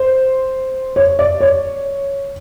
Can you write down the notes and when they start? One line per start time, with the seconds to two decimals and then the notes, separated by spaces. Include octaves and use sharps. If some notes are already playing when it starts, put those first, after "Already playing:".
Already playing: C5
0.96 C#5
1.19 D5
1.41 C#5